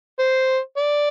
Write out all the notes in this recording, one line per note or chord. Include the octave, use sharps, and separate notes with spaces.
C5
D5